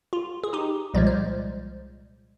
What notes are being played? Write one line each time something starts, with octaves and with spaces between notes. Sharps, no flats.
F4
G#4
D#4 G4
C2 A#2 F3 G#3 D5
C5